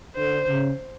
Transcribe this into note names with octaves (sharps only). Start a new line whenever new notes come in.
D3 C5
C#3